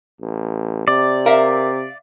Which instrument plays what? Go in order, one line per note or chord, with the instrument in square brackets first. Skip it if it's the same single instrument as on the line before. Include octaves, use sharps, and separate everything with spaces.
[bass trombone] A1
[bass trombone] C3 [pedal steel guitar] D5
[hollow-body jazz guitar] A#4 [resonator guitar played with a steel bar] E5 F5